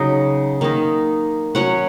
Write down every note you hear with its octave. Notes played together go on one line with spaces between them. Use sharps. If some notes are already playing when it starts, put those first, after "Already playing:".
Already playing: C#3 F#3 D#4 D#5
D#3 A#3 D#4
F#3 C#4 C#5 F#5